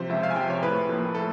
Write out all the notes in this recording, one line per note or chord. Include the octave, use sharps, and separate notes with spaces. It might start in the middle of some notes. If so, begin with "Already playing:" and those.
Already playing: C3 F3 C5
C#2 E5
F5
G#5
C3 F3 G5
C#5
A2 B4
F3 A#3 A4
A2 A4